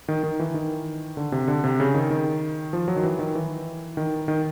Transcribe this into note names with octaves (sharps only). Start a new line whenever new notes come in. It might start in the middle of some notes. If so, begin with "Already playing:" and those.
D#3
D#3
E3
D#3
D3
C3
D3
C3
C#3
D#3
D#3
F3
F#3
D#3
E3
D#3
E3
D#3
D#3